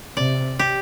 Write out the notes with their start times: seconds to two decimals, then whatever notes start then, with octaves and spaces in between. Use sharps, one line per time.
0.16 C3 D5
0.59 G4